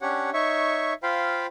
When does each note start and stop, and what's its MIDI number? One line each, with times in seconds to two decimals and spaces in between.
0.01 0.30 61
0.01 0.30 62
0.01 0.30 67
0.01 0.30 73
0.01 0.30 78
0.33 0.93 63
0.33 0.93 73
0.33 0.93 76
0.33 0.93 85
1.03 1.47 65
1.03 1.47 72
1.03 1.47 77
1.03 1.47 79
1.03 1.47 83